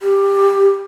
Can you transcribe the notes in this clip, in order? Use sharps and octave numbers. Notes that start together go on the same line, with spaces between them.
G4